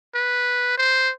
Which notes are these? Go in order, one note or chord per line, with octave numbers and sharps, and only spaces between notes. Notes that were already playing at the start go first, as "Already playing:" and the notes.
B4
C5